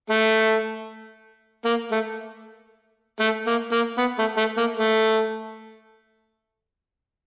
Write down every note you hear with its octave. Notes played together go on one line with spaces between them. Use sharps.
A3
A#3
A3
A3
A#3
A#3
B3
A3
A3
A#3
A3